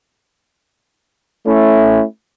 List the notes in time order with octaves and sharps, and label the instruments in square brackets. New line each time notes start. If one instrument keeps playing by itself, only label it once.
[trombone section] A3 C#4 E4